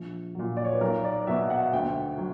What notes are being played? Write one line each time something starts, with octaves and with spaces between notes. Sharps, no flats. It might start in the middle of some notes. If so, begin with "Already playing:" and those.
Already playing: A#1
A#2 F#3
D5
C#5
B4
B1 A#4
D5
B2 F#3 E5
F#5
D2 G5
F#3